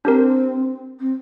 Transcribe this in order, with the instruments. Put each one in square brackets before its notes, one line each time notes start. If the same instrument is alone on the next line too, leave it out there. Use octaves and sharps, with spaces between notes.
[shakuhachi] C4 [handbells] D4 G4 A#4
[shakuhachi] C4